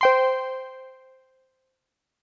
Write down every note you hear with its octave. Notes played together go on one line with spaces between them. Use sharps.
C5 G5 C6